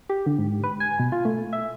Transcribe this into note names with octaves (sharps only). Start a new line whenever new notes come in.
G4
D3
G#2
B4
G#5
B2
F4
A3
E5